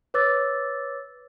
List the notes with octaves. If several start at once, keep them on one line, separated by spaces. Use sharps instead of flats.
B4 C#5 D6 E6 A6